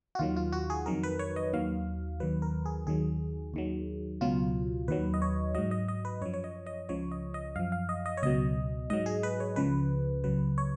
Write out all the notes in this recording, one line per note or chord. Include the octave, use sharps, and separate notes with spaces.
F#4
D#2 D#3 F#3 F4
F4
F#4
G#4
F2 D#3 F#3 A#4
B4
C#5
D#5
D#2 D#3 F#3 F5
D#2 D#3 F#3 B4
A#4
G#4
D#2 D#3 F#3 G#4
D#2 D#3 F#3
C#2 B2 F#3 F4
D#2 D#3 F#3 B4
D#5
C#5
G#2 F#3 D#5
D#5
D#5
B4
F#2 F3 C#5
C#5
D#5
D#5
C#2 C#3 F3 C#5
D#5
D#5
F#2 F3 F5
F5
D#5
D#5
C#5
C#2 B2 F#3 D#5
G#2 F#3 D#5
G#4
B4
C#5
C#2 C#3 F3 B4
C#2 C#3 F#3 B4
C#5